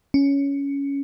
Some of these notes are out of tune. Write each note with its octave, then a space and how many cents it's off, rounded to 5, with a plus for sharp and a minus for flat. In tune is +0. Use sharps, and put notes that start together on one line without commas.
C#4 +10